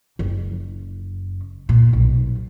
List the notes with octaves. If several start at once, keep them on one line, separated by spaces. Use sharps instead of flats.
F#1
A#2
B1